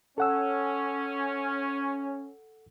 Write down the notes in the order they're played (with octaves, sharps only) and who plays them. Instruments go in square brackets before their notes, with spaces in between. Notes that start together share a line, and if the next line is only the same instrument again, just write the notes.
[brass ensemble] C#4 [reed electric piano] A4 F#5 E6